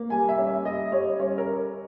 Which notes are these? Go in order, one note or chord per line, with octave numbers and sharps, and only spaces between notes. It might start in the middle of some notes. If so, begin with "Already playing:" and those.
Already playing: A#3
G3 G#5
E5
C#4
E5
G3 D#5
G3 C#5
C#4 C#5
A#4